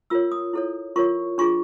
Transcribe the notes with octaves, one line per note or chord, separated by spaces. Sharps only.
F4 A#4 C#5 E6
D#6
E4 A4 C#5
F4 A#4 C#5 C#6
D4 F4 G#4 C#6